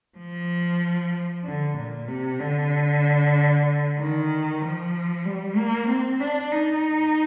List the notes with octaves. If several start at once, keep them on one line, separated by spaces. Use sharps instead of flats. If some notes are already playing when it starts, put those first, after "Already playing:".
F3
D3
A#2
C3
D3
D#3
F3
G3
A#3
C4
D4
D#4